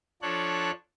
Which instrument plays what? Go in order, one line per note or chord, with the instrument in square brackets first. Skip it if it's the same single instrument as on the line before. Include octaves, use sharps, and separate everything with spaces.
[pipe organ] F3 D4 A4 C#5 F#6